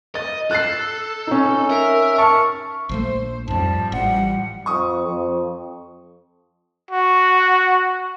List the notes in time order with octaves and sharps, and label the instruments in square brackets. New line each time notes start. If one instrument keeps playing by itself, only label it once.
[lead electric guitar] D#5 [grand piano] A6
[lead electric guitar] A4 [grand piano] F#6 A6 C7
[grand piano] C#4 D#4
[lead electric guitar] A#4 [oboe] E5
[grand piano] A5 F6 [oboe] C#6
[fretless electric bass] A#1 F3 A3 [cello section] C5
[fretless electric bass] F2 G#2 [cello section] F3 G3 [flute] A5
[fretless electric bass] A1 [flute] F#5
[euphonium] F2 [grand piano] C#6 D#6
[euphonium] F2
[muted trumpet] F#4